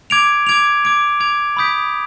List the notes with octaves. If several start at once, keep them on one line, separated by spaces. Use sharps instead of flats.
D6 G#6 D7 F7
D6 G#6 D7 F7
D6 G#6 D7 F7
D6 G#6 D7 F7
B5 D#6 G6 B6 D7